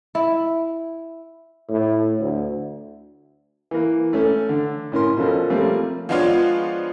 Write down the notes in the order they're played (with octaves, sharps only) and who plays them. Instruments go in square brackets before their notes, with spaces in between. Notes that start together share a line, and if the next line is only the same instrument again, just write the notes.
[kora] E4
[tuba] A2
D2
[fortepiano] E3 A#3
A3 C#4 A4
D3
A2 C#4 A#4 C6
B2 F3 C#4 A4 A#4
F3 G3 A3 A#3 C4 C#4
[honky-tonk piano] F3 G#3 B3 D4 F4 C#5